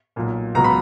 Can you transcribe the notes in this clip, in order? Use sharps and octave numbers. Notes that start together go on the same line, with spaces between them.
B1 A#2 A#3
C#2 B2 F#3 B3 A#5
B5